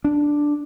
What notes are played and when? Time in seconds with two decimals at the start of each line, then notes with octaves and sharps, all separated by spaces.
0.04 D4